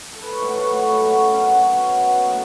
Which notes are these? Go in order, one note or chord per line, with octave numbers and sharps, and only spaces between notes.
A4
B4
C#5
A2 F#3 B4 E5
A4 B4 C#5
A2 F#3 F#4 B4
E4 A4
B2 F#3 C#4 F#4
F#2 F#3 C#4 F#4
C#4 F#4
B2 F#3
B2 F#3
A2 B3 E4